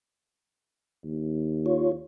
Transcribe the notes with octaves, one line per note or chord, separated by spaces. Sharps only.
D#2
F4 C#5